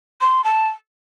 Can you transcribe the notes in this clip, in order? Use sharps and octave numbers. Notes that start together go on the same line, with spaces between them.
C6
A5